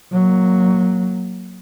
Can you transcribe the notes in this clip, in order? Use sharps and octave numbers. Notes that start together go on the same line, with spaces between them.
F#3 A#3